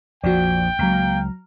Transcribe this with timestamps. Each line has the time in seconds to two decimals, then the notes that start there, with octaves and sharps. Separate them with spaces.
0.23 A#1 F2 A#2 F3 F#4 D5 G5
0.79 C#2 F#3 A#3 A#5 F6